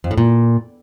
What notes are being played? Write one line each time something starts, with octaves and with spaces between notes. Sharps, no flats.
F2
A2
A#2